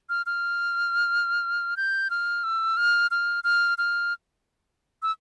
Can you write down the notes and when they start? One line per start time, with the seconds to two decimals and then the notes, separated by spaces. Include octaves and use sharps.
0.09 F6
0.26 F6
1.77 G6
2.10 F6
2.44 E6
2.77 F6
3.11 F6
3.44 F6
3.78 F6
5.02 E6